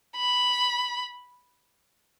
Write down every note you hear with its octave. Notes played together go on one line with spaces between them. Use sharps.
B5